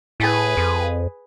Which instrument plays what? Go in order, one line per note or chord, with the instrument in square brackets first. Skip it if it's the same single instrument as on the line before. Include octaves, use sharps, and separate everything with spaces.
[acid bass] A2 [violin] G#4 B4
[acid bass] F2